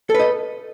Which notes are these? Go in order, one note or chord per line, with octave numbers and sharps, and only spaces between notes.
A4 B4 D#5